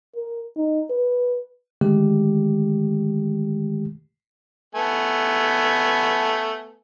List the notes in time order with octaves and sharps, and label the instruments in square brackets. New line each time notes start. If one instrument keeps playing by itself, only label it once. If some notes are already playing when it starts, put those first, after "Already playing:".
[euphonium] A#4
D#4
B4
[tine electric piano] D3 D#3 G#3 A3 G4
[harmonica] A3 B3 G#5